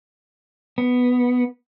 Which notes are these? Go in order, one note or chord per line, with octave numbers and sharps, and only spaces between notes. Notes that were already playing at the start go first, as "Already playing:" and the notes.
B3